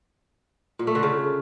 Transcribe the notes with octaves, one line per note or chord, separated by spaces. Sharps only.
A#2
A3
D3
C#3